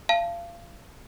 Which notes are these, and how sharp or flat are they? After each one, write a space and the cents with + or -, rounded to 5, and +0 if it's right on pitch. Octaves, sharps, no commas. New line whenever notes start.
F5 -30 A5 +0